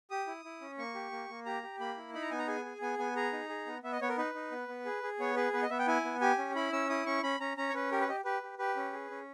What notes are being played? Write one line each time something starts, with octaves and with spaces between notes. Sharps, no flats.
G4 D#6
E4
E4
C#4
A#3 C#6
G4
A#3
A#3
G4 A#5
G4
A#3 B5
E4
D#4 B5
A#5
B3 G#5
A#5
G#4 G#5
G#4
B3 G#5
B3 G#5
G#4 A#5
D#4
G#4
B3
B3 E5
D#5
B3 C#5
A#4
D#4 B4
D#4
B3
B3
G#4
G#4
B3 C#5
G#4 B4
B3 B4
D#5
B3 E5
G5
E4 G#5
B3
G4 G#5
C#4
E4 B5
C#4 E6
E4 D#6
C#4 C#6
C#4 B5
C#4 A#5
C#4 A#5
C#5
C#4 B4
G4 A#4
B4
G4 D#5
G4 B4
G4
G4 B4
C#4
G#4
C#4